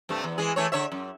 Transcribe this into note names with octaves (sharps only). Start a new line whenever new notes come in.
G2 C3 A3
E2
E3 G#3 G#4
E3 A3 C#5
D3 C#5 E5
F#2